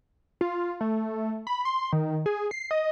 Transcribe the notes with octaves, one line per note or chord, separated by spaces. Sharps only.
F4
A3
B5
C6
D#3
G#4
C7
D#5